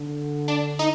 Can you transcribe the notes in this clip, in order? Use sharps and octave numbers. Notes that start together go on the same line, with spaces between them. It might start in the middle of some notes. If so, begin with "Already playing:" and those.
Already playing: D3
D4
D#4